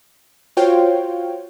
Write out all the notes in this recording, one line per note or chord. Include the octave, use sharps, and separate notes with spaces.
F4 F#4 C5 C#5 F5 G5